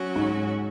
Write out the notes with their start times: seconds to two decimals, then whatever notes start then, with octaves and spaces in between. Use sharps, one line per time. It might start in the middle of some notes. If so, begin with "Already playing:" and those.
Already playing: F#3 C#4 F#4
0.16 G#2